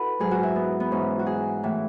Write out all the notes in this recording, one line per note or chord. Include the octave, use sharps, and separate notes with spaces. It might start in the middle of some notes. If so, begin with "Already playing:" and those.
Already playing: E4 F#4 A4 B4
G#2 F#3 G#4
F#4
E4
B3
B3
G#2 E3 C#4
F#4
G#4
A2 E3